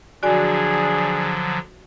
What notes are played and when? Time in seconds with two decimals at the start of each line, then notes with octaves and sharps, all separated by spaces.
0.23 D3 F3 F#3 D4 F#4 G#4 D5 G#5